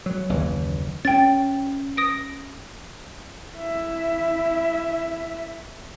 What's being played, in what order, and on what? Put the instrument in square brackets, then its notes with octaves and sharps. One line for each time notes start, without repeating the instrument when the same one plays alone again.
[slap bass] F#3
F#1 D#2 E3
[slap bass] C#4 [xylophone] G5 A6
[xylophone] D#6 A#6 D7
[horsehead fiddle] E4 E5